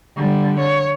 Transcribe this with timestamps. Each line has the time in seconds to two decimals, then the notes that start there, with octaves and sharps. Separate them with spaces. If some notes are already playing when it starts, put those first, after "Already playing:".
0.17 D3 G3
0.59 C#5